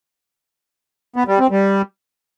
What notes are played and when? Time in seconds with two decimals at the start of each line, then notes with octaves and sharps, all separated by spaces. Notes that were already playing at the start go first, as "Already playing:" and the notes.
1.16 B3
1.28 G3
1.39 C4
1.51 G3